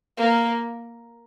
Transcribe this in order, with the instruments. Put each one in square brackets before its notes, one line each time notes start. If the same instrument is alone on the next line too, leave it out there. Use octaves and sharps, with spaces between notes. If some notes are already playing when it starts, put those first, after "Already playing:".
[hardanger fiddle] A#3